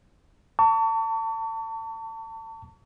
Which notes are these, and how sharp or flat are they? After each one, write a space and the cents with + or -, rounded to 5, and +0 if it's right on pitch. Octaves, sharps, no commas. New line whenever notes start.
A5 +30 C#6 +40